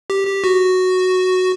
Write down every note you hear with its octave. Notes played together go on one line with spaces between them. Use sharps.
G4
G4
F#4